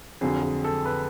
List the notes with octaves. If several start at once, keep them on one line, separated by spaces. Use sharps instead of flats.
F2 D3 F#3 G#4
G#4
A4
B4